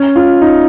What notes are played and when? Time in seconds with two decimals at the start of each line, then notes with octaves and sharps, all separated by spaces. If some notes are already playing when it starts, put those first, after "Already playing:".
Already playing: C#4
0.16 F4
0.42 D#4